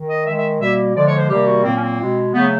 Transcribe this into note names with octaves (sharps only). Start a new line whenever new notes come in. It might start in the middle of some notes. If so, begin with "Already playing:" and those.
Already playing: D#3
D#5
D#3 G#3 E5
E5
B2 G3 A#3 E5
D3 F3 G#3 D5
C#5
C5
C3 D#3 G3 A#3 G4
F#4
A#2 F#3 A#3 C4
C#4
C4
B2 G#3
C#3 F#3 A3 B3